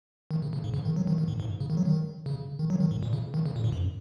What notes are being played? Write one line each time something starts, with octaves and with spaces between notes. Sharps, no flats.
D#3
C#3
C#3
G#2
C#3
D#3
F#3
D#3
D#3
G#2
G#2
C#3
D#3
F#3
D#3
C#3
D#3
F#3
D#3
G#2
A#2
C#3
D#3
C#3
A#2
G#2
F#2